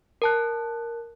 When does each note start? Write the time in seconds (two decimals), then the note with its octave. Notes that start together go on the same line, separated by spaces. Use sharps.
0.22 A#4 A5 F#6